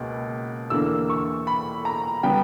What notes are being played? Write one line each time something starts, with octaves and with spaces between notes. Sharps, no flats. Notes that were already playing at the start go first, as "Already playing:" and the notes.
Already playing: C#2 B2 A#3
E2 D3 A#3 E6
C#6
B5
A#5
C#3 G3 B3 G5